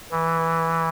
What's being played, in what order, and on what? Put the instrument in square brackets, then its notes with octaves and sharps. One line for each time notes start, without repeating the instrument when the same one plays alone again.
[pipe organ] E3